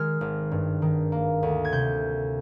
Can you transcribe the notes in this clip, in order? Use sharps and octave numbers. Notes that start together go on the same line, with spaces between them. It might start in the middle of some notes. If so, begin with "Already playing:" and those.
Already playing: D#3 G#3 F6
G#1
G2
D#3
A#3
D2
G#6
C3 G6